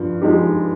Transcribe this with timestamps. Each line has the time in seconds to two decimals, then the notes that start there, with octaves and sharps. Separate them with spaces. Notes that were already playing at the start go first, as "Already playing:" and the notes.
Already playing: G2 F3
0.22 F3 G#3 D#4 G4